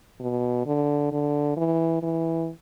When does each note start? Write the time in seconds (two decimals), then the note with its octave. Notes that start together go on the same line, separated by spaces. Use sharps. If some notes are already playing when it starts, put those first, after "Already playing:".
0.20 B2
0.66 D3
1.12 D3
1.57 E3
2.02 E3